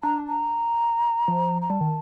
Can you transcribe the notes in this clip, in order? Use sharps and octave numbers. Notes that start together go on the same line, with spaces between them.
D4 A#5
A#5
F3
A#5
G3 A5
D#3